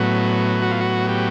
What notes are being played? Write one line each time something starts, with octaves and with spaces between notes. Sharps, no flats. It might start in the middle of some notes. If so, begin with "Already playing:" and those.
Already playing: A2 F#3 B3
F#4
F4
F#4
G4